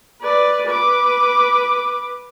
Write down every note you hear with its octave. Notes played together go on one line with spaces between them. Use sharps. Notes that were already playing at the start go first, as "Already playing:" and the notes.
B4 D5
B4 D6